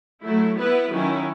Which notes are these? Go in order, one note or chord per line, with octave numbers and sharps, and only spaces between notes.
F#3 A3 E4
B3 E4 B4
D#3 F#3 C#4 E4